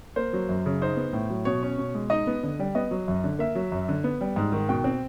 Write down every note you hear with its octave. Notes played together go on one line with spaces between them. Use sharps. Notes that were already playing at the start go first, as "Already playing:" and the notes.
A#3 C5
F#3
F#2
C#3
D#4 C5
B3
A2
F#3
B2 C#5
C#4
B2
G#3
D#4 D#5
B3
D3
G3
B3 D#5
F#3
F#2
D3
A#3 E5
F#3
F#2
D3
B3
G3
G#2
D#3
B2 G5
C4